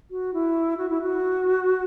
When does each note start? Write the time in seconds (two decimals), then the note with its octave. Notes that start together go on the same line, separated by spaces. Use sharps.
0.11 F#4
0.34 E4
0.77 F#4
0.90 E4
1.02 F#4